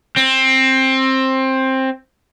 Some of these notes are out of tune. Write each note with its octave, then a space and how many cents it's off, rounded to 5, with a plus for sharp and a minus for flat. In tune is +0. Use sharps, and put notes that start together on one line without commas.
C4 +15